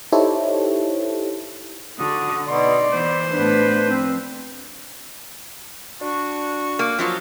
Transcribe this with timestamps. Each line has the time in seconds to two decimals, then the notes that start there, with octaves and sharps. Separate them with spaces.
0.12 D#4 E4 G4 A4 C5 C#5
1.99 D3 F#4 D#6
2.48 B2 D#4 D5 C6
2.92 E3 B3 C5
3.31 A2 B3 D4 B4
3.87 F3 C4
6.01 D4 F#4 C#6
6.79 A#3
6.99 F3 F#3 F4